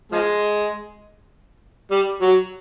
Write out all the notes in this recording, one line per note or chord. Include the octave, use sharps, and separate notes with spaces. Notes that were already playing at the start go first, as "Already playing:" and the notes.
F3 G#3
G3
F#3